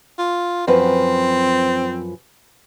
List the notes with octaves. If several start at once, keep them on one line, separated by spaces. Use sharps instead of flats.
F4
F#2 F3 C4 B4